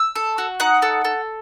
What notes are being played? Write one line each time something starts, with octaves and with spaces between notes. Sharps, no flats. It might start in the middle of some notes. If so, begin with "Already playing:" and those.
Already playing: E6
A4
F#4
D#4 F#5
A4
A4